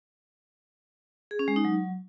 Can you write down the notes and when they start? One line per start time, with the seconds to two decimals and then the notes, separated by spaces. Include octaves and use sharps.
1.31 G#4
1.39 C#4
1.48 G#3
1.56 D#4
1.65 F#3